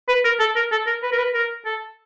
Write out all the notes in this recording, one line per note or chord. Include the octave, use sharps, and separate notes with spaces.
B4
A#4
A4
A#4
A4
A#4
B4
A#4
B4
A#4
A4